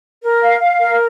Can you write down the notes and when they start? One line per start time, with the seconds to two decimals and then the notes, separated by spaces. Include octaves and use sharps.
0.23 A#4
0.42 F5
0.61 F5
0.80 A#4